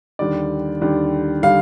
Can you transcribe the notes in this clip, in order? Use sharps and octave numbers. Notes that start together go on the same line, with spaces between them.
D#2 D3 G3 D5
D#2 D3 G3
D3 G3 F5